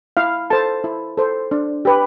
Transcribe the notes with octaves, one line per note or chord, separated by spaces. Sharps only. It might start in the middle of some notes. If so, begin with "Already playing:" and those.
E4 F5
A4 C5 A5
E4
A4 C5
D4
G4 B4